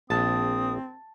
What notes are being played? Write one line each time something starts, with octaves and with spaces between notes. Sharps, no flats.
A#1 C4 A5 D#6